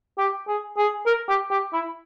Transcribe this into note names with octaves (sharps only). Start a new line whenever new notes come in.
G4
G#4
G#4
A#4
G4
G4
E4